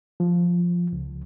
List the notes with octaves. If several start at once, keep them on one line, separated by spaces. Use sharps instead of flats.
F3
C#2